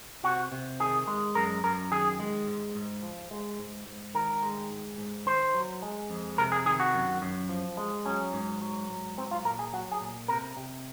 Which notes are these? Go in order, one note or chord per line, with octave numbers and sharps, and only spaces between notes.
C3 F#4
C3
D#3 G#4
G#3
F#2 A#4
F#2 A#4
D#3 G#4
G#3
G#2
G#2
F3
G#3
G#2
G#2
D#3 A#4
G#3
G#2
G#2
D#3 C5
F#3
G#3
F2
C3 A#4
G#4
D#3 G#4
F#4
F#2
F#2
F3
G#3
F#3 C#4
G#2
F#3
G#2
F#3 C4
F4
A#2 A#4
G#4
F#3 F#4
G#4
A#2
C3 A#4
C3